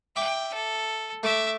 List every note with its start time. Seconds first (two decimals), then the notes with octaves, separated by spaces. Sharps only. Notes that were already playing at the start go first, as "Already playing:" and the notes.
0.16 E5 G5 D6
0.54 A4
1.23 A3 E5 D6